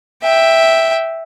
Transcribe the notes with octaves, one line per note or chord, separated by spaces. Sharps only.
E5 G5